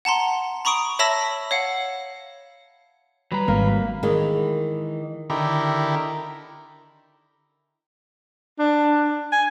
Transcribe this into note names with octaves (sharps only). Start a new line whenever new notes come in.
F#5 A5 A#5 C6
A#5 B5 C#6 D#6 D7 F7
C#5 E5 A5 B5 E6 A#6
C#5 F5 F#5
F#3 G3 B4 A#5
G#1 A#3
D#3 E3 G#3
D3 D#3 E4 G4 A#4
D4
G#5